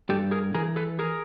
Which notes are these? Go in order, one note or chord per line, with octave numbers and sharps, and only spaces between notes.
G2 G4 A4
G#4 A#4
E3 G#4 A#4
A4 B4
G#4 A#4